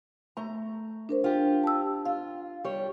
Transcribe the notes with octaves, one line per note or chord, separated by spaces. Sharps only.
A3 A#5
D4 A#4 C5
F4 G4
A5 E6
F4 F5
G3 C#5